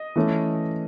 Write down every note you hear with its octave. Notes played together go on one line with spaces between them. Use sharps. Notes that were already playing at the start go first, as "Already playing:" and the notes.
Already playing: D#5
E3 A3 C#4